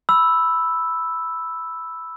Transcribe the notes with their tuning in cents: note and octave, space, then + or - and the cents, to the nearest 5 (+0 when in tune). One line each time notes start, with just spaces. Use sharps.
B5 +0 E6 +0